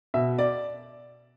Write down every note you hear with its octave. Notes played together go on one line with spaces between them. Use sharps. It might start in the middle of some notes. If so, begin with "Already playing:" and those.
B2 E5
D5